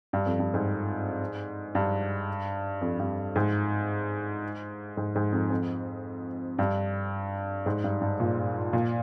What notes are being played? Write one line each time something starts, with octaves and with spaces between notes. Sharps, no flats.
G2
F2
G2
G#2
G2
F2
G2
G#2
G#2
G#2
F2
F2
G2
G#2
G2
G2
A#2
A#2